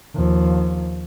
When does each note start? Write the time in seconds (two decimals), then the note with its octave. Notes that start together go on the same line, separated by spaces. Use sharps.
0.15 D#2 F3